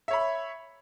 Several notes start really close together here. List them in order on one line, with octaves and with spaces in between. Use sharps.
E5 C#5 B5